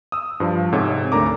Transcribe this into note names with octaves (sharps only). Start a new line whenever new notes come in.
D#6 E6
G2 F3
G#2 C3 A4 C#5
D2 A3 D4 A#4 A#5 D6